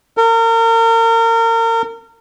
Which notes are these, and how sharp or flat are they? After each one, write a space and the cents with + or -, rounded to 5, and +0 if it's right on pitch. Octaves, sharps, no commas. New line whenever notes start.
A#4 -35